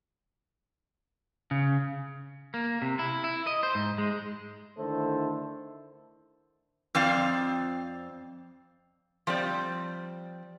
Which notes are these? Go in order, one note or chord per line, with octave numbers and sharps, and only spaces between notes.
C#3
A#3
C3
E4
E4
D#5
C5
G#2
G#3
D3 D#3 A3 E4 A4 C5
F2 C4 D5 F5
F3 G3 C4 D5